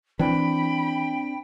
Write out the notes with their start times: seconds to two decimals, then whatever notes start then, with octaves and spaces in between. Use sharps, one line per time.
0.19 E3 C4 D4 G5 B5